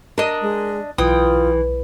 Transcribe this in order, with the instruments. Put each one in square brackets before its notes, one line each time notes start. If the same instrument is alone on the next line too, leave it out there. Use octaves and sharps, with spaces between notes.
[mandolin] D4 D#5 [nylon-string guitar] A#4
[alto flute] G#3
[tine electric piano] B1 [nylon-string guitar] E3 [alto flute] F4 [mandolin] G5 D#6